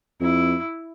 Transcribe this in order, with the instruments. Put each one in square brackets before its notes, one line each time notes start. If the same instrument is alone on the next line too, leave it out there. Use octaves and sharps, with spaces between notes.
[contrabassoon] F2 [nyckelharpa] E4